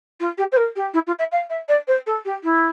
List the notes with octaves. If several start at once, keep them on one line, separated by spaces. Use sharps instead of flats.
F4
G4
C5
A#4
G4
E4
F4
E5
F5
E5
D5
C5
A4
G4
E4